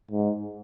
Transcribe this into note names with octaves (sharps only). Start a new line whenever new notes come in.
G#2